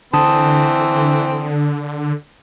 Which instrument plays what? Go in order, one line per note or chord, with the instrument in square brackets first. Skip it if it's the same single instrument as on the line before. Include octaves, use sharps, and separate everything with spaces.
[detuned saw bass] D3 [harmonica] E3 C4 [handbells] A5 D#6